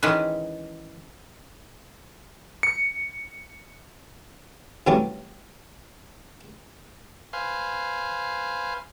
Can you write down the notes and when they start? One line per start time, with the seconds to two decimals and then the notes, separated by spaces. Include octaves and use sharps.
0.03 D#3 E3 G#3 C#4 B4
2.63 C#7
4.87 C3 E3 F#3 G3 A3 C#4
7.33 B4 C5 F5 G#5